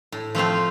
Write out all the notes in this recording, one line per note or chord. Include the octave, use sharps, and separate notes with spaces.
A2
F3 A3 C4 F4